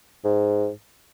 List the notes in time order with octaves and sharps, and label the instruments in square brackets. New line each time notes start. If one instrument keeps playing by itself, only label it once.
[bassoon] G#2